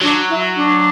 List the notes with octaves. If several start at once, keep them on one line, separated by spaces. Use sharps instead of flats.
F#3 D4
E4
D4